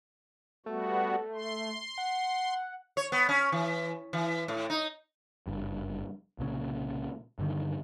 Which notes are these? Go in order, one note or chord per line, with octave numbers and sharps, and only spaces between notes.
G3 A3 B3 F#4
C6
F#5
C#5
B3
C#4
E3
E3
A2
D#4
F#1 G2
C2 A#2 C#3
G2 D3 D#3